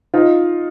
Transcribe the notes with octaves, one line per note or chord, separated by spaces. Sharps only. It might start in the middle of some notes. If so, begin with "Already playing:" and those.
D#4 F4